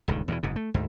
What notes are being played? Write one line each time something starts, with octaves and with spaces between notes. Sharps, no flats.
D#1 C#2 G2 D#3
E2 B2 D#3 E3
F#1 G#2 C3
A3
D2 G#2